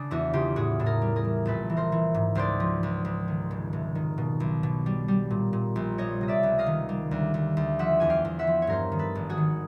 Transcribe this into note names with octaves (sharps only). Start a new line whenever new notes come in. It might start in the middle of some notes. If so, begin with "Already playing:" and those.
Already playing: C#3 D4
E2 E4 F#4
C#3 F4 G4
A2 F#4 G#4
A2 A4
G#4 A#4
G3
G#4 A#4
E3
A#1 A4 B4
E3
A#4 C5
E3
G#2
C#2 C5 D5
F3
C#2
C#2
D#3
F1
F1
D#3
B2
B1
B2
G3
G3
A#2
A#2
A#1
G3 C#5 D#5
C3 D#5
D5 E5
C#2
D#5 F5
D#3
G3
D2
D2
D2
F3 E5 F#5
E2 G#5
F5 G5
E2
E5 F#5
F3
C#5
G2 A#4 C5
D#3
A4 B4
G#1
F#4 G#4
D#3